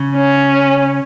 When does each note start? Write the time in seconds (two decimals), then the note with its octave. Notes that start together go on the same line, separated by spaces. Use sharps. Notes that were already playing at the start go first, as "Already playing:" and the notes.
Already playing: C#3
0.16 C#4